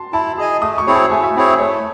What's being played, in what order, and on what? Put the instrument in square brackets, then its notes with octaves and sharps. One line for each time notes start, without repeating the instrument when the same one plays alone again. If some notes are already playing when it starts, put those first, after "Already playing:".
Already playing: [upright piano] A5 C6
[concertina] E4 [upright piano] A5
[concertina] G#4 D#5 G#5
[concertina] A3 [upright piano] D#6
[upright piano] C#6
[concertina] C4 E4 G#4 C#5
[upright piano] A5
[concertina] A3 [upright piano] G#5
[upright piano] E5
[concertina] C4 E4 G#4 C#5
[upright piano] E5
[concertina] A3 [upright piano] C#5